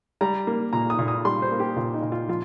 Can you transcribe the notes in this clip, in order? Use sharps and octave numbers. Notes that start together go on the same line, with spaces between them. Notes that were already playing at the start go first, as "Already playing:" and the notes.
G3 A#5
A#3
A#2 A#5
D#6
A#2
D#6
G3 C6
C5
A#3
G4
A#2 F4
D#4
A#2
F4
F3 F4